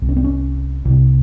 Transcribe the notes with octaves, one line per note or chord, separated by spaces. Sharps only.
C2 C3
C#4
C4
C#4
C2 C3